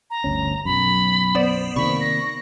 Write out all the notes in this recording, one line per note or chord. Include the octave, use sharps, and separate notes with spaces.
A#5
G1 D2 C#4
B1 F#2 B5
B3 C5 D5
C3 D#3 A#3 B5 C#6
A#6